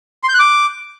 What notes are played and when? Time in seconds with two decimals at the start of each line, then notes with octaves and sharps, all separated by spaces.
0.24 C6
0.29 G6
0.34 F#6
0.39 D6